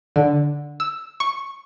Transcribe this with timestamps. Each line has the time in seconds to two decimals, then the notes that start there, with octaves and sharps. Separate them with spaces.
0.16 D3
0.80 E6
1.20 C#6